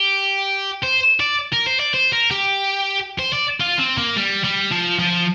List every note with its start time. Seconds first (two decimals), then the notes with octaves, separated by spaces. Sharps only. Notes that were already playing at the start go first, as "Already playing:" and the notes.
Already playing: G4
0.83 C5
1.20 D5
1.53 A#4
1.67 C5
1.80 D5
1.94 C5
2.13 A#4
2.31 G4
3.19 C5
3.33 D5
3.60 F4
3.79 C4
3.98 A#3
4.16 G3
4.44 G3
4.71 F3
4.99 F3